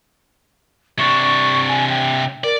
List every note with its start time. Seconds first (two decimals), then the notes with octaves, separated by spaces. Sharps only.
0.99 C3 D4 C#6
1.68 G#5
1.90 G5
2.44 A#4 D5